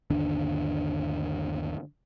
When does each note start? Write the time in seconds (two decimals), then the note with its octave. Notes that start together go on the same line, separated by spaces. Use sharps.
0.10 G1 D#2 D3 D4